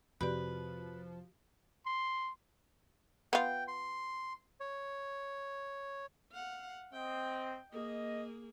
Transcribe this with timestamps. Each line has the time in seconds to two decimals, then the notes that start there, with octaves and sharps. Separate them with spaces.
0.21 F2 C3 F3 F#4 G4 B4 D5
1.86 C6
3.33 B3 F4 G5
3.68 C6
4.60 C#5
6.32 F5 F#5
6.93 C4 D#5 G5
7.73 A#3 G#4 D#5